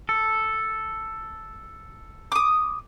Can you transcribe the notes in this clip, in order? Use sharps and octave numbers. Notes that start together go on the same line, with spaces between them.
A4
D6 D#6